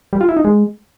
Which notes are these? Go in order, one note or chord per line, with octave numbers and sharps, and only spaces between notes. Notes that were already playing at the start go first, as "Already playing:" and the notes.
G3
F4
E4
D#4
G#3